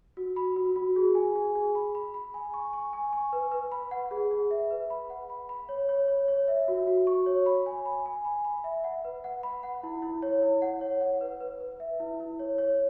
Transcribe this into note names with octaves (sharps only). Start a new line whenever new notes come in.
F#4
B5
F#4
F#4
G#4
G#5
G#4
G#4
B5
B5
B5
G#5
C#6
C#6
G#5
C#6
B4
B4
B5
F#5
G#4
G#4
E5
B4
B5
F#5
B5
B5
C#5
C#5
C#5
C#5
E5
F#4
F#4
C#6
C#5
B5
G#5
B5
G#5
B5
B5
E5
F#5
B4
F#5
B5
F#5
E4
E4
C#5
E4
F#5
C#5
F#5
B4
B4
B4
E5
E4
E4
C#5
C#5